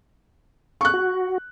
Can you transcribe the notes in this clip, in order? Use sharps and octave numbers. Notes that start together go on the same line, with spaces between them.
C#6 F#6
F#4